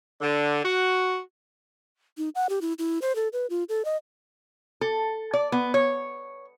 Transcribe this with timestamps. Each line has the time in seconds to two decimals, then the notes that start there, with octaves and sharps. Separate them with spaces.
0.22 D3
0.64 F#4
2.18 D#4
2.35 F#5
2.49 G4
2.61 E4
2.79 E4
3.02 C5
3.16 A4
3.33 B4
3.50 F4
3.69 A4
3.85 D#5
4.81 A4
5.33 D5
5.52 B3
5.74 C#5